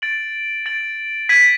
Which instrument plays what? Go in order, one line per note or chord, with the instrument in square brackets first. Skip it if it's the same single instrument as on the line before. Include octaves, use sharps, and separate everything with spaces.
[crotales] A6 D7 F#7
A6 D7 F#7
G#6 B6 D#7 F#7